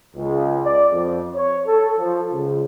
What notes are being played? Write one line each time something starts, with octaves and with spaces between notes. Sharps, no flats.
C#2
D5
F2
C#5
A4
F3
C#2